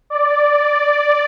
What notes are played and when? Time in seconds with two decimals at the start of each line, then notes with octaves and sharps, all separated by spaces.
0.10 D5
0.42 D5